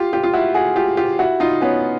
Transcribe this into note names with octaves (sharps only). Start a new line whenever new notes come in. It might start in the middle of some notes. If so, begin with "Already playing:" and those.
Already playing: F4 G4
F4 G4
F4
E4 F#4
F#4 G#4
F4 G4
F4 G4
E4 F#4
D#4 F4
B3 C#4